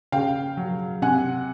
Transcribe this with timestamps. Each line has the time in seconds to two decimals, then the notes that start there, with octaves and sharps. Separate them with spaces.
0.12 C#3 F5 G5
0.57 F#3
1.02 C3 F#5 G#5